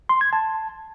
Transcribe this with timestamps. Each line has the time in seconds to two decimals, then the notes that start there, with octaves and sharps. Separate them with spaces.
0.09 C6
0.21 G#6
0.33 A5